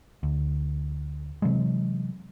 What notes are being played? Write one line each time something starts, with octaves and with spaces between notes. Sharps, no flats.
D2
C3 E3 F#3 G#3